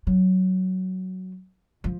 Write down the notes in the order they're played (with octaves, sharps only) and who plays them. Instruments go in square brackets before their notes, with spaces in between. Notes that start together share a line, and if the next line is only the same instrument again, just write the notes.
[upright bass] F#3
F3